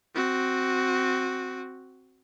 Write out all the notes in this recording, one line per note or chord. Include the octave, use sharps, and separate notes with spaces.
C4 F#4